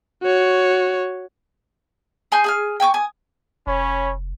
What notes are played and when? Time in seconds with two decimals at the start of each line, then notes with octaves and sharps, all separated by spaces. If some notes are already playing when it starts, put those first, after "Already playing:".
0.22 F#4 C#5
2.32 G#4 G#5 C6 G6
2.44 G#4 G#5 F6
2.80 G5 G#5 C#6 D6
2.94 G#5 D#6
3.67 F1 C#4 C#5 B5